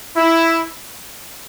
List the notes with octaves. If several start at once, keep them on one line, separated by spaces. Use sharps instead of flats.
E4